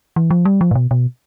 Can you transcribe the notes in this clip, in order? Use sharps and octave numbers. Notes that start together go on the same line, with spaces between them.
E3
F3
G3
F3
A2
B2
B2